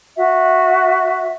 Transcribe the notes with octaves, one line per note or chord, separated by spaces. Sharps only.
F#4 E5